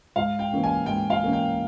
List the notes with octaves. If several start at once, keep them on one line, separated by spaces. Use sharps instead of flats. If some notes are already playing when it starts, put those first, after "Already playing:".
G#2 F5
G5
E3 A#3 C#4
G#5
G#2 G5
F5
E3 A#3 C#4
G5